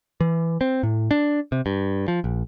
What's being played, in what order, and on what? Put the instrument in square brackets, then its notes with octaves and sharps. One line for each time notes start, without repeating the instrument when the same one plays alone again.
[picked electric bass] E3
C4
A2
D4
C3
G2
F3
A#1